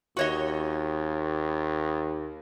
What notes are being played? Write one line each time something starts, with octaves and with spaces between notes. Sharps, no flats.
D#2 F#4 C#5 D#5